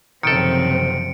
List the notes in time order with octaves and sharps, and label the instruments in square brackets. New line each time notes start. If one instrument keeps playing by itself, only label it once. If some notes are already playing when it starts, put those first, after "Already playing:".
[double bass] F#1 C3 [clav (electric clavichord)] D#3 A4 [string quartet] F3 C4 [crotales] C#7 D7